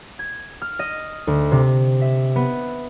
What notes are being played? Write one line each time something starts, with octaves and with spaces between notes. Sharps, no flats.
G#6
F6
D#5
D2
C3
E5
B3